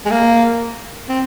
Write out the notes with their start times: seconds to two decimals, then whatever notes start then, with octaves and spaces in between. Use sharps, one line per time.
0.06 G#3
0.11 A#3
1.09 C4